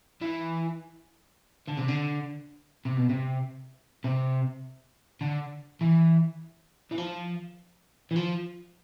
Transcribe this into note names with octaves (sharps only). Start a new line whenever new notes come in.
E3
D3
C3
D3
C3
B2
C3
C3
D3
E3
E3
F3
E3
F3